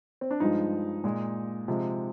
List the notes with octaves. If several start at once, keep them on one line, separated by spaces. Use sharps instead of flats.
C4
D4
G2 F3 G#3 D#4
A#2 G#3
C3 F3 G#3